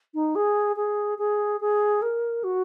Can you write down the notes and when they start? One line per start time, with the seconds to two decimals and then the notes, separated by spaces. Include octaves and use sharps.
0.14 D#4
0.35 G#4
0.76 G#4
1.18 G#4
1.60 G#4
2.02 A#4
2.43 F#4